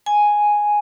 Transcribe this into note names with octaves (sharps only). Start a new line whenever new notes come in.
G#5